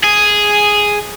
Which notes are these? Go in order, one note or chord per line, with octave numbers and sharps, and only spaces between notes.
G#4